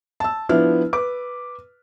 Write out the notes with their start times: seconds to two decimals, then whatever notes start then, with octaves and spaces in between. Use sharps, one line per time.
0.20 A5 E6
0.49 F3 B3 D4 E4 F6
0.93 B4 D6